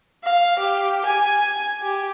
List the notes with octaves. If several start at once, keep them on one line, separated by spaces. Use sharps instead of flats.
F5
G4
G#5
G4